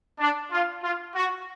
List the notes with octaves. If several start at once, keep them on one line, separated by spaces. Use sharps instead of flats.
D4
F4
F4
F#4